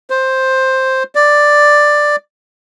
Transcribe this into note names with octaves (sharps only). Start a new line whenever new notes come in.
C5
D5